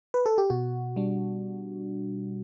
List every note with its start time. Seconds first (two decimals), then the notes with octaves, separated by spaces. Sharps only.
0.14 B4
0.26 A4
0.38 G4
0.50 B2 F#4
0.96 G3 D4